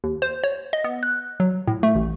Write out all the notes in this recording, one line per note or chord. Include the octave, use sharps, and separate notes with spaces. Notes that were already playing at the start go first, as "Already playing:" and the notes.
D#2
C5
C#5
D#5
B3
F#6
F#3
A2
A3
A1